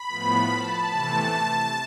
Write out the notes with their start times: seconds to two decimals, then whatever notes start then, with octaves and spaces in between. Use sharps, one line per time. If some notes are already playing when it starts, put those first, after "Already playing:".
Already playing: B5
0.08 A2 F3 B3
0.49 A5
0.91 C3 E3 A3